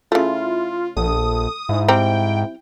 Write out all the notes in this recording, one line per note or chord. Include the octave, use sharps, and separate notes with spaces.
C#3 A3 E4 F4
A#1 A4 D#6
G#2 E4
G3 C4 G5 A#5